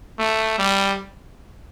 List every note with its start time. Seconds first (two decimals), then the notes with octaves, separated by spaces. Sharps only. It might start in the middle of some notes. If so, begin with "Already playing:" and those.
0.19 A3
0.58 G3